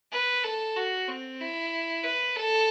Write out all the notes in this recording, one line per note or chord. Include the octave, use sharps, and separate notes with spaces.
B4
A4
F#4
C4
E4
B4
A4